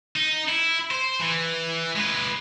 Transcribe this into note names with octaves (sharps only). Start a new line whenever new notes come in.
D#4
E4
C5
E3
G#3 B4